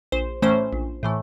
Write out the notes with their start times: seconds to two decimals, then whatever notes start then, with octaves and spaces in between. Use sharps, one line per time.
0.12 A#1 C5
0.42 A2 E3 A3 C#4 C5
0.73 A#1
1.03 A2 E3 A3